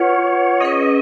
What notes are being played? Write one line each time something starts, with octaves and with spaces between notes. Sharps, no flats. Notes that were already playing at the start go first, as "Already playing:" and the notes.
Already playing: F4 B4 C#5 F#5
C#4 G#4 B4 D#5